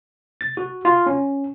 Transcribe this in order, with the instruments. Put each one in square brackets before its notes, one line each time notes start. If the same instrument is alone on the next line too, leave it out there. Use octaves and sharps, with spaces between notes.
[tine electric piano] A6
F#4
F4
C#4